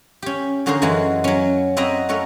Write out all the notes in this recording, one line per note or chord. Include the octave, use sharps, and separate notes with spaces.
C#4 G4
D3 C#4 F#4 G#4 A#4 C5
F#2 E3 G#3 F#4
F#3 C#4
C4 E4 F#4 D#5 E5 A#5
A3 C#4 F#4 A#4